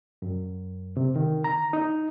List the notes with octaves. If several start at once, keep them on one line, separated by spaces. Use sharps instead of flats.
F#2
C3
D#3
A#5
D#4